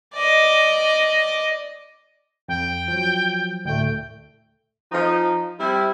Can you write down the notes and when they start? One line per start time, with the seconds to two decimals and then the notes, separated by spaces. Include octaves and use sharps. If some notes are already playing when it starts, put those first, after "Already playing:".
0.14 D5 D#5
2.49 F2 G5
2.88 F3 F#3
3.65 D2 A2 A3 G5
4.92 F3 D#4
5.59 G3 C4 E4